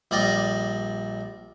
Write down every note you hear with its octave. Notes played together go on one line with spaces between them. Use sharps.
A#1 G3 D5 D#5